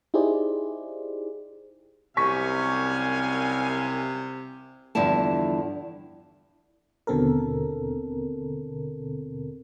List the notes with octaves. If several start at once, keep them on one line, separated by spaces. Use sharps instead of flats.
D#4 E4 G4 G#4 C5 D5
C2 F#2 C3 F5 G#5 C#6 B6
E2 G2 D3 F3 E4 A5
D#2 B2 D3 C4 A4 A#4